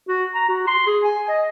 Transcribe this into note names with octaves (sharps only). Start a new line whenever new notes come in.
F#4
A#5
F#4
C6
G#4
G#5
D#5